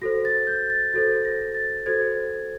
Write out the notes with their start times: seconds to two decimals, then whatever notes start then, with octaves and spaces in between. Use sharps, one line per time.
0.02 F#4 A4 C5 A#6
0.25 A6
0.47 G6
0.70 A6
0.93 F#4 A4 C5 A6
1.25 A#6
1.54 A6
1.86 F#4 A4 C5 G#6